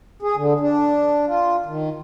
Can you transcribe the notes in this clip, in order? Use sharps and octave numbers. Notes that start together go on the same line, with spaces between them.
G#4
D3
D4
F4
D#3